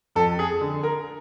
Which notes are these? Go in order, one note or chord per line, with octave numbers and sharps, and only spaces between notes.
F2 A4
G#4
D3
A#4